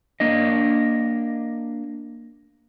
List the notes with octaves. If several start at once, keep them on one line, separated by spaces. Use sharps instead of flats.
A#3 D4 D#5